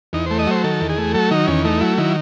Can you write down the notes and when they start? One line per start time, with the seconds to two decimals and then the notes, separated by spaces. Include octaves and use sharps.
0.13 E2 D#4
0.26 A3 C5
0.39 D#5
0.47 F#3 C5
0.64 D#3 A4
0.81 E2
0.90 G#4
0.98 A3
1.14 F#3 A4
1.31 D#3 D#4
1.47 E2 C#4
1.65 A3 D#4
1.81 F#3 E4
1.98 D#3 E4